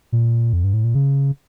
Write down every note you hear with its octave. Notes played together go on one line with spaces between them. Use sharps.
A#2
F2
G2
A2
A#2
C#3